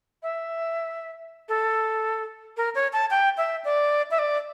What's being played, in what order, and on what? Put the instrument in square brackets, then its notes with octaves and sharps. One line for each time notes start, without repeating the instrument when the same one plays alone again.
[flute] E5
A4
A#4
C#5
A5
G5
E5
D5
E5
D5